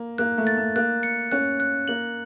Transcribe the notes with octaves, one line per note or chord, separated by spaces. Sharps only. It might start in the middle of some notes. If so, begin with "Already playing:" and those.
Already playing: A#3
A#3 F#6
A3
A6
A3
A#3 F#6
C#7
C#4 F#6
F#6
A#3 F#7